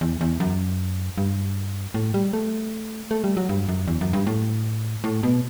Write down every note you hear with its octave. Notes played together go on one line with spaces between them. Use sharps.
E2
E2
F#2
G2
A2
G3
A3
A3
G3
F#3
G2
F#2
E2
F#2
G2
A2
A2
B2